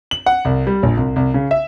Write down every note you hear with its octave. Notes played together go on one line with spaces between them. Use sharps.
F#7
F#5
C2
G3
A#1
C2
C2
C#3
E5